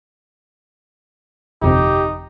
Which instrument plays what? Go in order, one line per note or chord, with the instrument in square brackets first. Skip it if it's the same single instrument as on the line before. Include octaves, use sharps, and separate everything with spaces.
[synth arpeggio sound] G1 F2 C3 [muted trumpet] D#4 [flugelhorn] G4